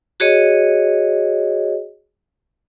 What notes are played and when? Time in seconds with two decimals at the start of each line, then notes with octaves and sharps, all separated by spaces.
0.20 F#4 G#4 C#5 D#5